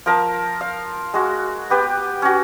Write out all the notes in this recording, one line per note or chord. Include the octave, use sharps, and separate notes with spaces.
F3 A#4 A5
F5
G#3 F#4
B3 G4 B4
C#4 F#4